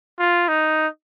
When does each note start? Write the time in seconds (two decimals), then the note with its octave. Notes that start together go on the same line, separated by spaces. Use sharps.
0.19 F4
0.48 D#4